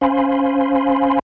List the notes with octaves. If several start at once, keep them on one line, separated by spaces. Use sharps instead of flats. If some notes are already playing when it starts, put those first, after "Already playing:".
C#4 C5 F5 G#5 B5 C6